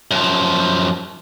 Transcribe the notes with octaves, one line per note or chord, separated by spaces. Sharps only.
F#2 F3